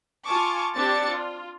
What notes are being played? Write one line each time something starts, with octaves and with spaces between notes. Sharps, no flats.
F4 G#5 A5 C#6 D6
C4 D4 G4 D5 A6 C#7
F4